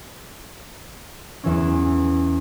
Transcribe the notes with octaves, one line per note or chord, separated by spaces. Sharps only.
E2 E3 C#4